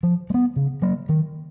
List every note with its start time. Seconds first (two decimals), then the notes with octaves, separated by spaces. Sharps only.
0.03 F3
0.30 G#3
0.34 B3
0.56 C#3
0.82 F#3 A#3
1.09 D#3